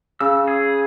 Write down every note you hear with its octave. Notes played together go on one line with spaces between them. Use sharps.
C#3 E6
G#4